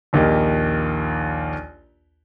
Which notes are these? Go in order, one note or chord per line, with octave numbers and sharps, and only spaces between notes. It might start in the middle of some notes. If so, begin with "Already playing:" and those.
A#1 D#2 A#3 G4 D#5